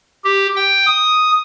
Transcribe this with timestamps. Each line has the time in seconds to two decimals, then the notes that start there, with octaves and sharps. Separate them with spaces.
0.24 G4
0.56 G5
0.86 D#6